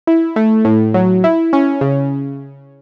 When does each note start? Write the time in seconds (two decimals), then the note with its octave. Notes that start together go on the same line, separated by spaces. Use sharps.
0.07 E4
0.36 A3
0.65 A2
0.94 F#3
1.24 E4
1.53 C#4
1.81 C#3